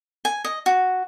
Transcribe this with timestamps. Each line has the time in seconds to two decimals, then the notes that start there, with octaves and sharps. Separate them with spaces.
0.25 G#5
0.45 D#5
0.66 F#4